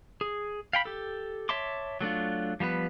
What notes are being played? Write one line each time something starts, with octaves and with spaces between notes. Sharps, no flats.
G#4
F5 G5 B5
G4 A4
C#5 E5 A5 C6 D6
F#3 A3 D4 F4
F3 G3 B3 B4